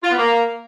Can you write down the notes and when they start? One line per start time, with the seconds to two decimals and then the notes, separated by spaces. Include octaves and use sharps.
0.03 F4
0.10 B3
0.18 A#3